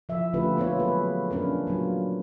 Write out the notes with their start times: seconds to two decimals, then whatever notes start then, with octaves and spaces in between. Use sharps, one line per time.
0.09 F3 E5
0.33 D3 A3 C#4 F4 G4 B4
0.57 A#3 B3 F4 C#5
0.79 F#3 G#4 B4
1.31 A#3 C#4 D4 A#4
1.67 F#3 A#3 F4